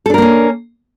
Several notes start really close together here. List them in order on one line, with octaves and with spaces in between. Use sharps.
A4 D4 A#4 A#3 C#4